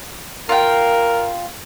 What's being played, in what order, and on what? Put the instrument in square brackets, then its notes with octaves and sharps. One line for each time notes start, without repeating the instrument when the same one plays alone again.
[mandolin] F4 G5 [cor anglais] A#4